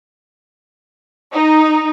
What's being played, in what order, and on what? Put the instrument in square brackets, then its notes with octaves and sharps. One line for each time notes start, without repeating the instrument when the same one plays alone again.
[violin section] D#4